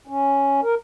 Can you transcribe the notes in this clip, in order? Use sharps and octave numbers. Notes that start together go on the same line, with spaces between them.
C#4
A#4